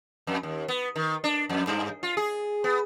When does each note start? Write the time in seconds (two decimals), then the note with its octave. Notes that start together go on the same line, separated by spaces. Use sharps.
0.27 F2
0.43 D#2
0.68 B3
0.96 D#3
1.24 D4
1.49 F2
1.67 G2
2.03 F4
2.17 G#4
2.64 B3